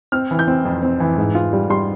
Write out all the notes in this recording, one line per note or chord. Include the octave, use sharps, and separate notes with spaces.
C4 F6
E3
G6
C4
F2
C4
E3
G#2
F4
G3
G3 C6